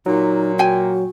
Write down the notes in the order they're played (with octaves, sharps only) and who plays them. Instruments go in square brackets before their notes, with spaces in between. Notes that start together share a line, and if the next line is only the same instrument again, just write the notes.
[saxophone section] A#2 [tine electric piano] F#3 [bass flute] D#4
[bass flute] F#4 [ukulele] G5 G#5